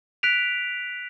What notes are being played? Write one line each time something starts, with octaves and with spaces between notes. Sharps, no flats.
F#6 B6 D7 F7